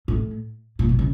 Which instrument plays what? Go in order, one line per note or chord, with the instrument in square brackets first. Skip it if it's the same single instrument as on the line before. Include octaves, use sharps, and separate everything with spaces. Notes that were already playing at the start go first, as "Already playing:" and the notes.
[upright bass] A2
A#2
B2
C#3